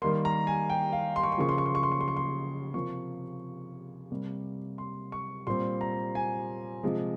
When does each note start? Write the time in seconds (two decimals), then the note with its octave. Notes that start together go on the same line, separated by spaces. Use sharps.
0.02 D#3 G3 A#3 C6
0.25 A#5
0.47 G#5
0.70 G5
0.93 F5
1.16 C6
1.23 C#6
1.32 C6
1.38 C#3 F3 A#3 C#6
1.49 C6
1.58 C#6
1.66 C6
1.75 C#6
1.83 C6
1.92 C#6
2.01 C6
2.08 C#6
2.17 C6
2.74 C3 F3 A#3 C#6
4.11 C3 G3 A#3
4.78 C6
5.12 C#6
5.47 A#2 G3 C4 C6
5.81 A#5
6.15 G#5
6.83 C3 F3 G#3